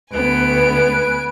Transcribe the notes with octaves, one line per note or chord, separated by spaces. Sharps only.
D2 B3 B4 G#5 D7